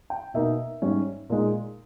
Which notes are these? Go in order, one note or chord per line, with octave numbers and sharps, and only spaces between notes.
G5
B2 A#3 D#4 E5
G#2 G3 C#4
A#2 G#3 D#4